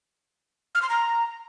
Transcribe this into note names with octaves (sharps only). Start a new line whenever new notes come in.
F6
C6
A#5